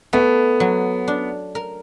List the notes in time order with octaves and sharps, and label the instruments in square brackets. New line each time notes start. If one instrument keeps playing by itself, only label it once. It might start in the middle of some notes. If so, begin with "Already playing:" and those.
[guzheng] A3 [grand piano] B3
[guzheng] F#3
D4
A#4